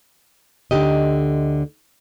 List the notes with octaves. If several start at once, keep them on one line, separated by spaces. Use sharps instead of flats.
D2 D3 D#4 G4 D#5